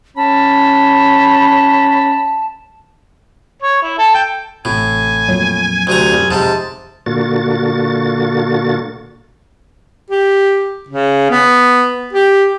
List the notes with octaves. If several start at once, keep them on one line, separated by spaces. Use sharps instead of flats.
C#4 A5 B5
C#5
E4
A4
G5
A1 A2 C3 G#5
F2 A#2 F#3
D2 C3 G#5 A#5
C2 F#2 C3
F2 G#2 C3 A5
A#2 D3 A#3 F#4 A6
G4
C#3
B3
G4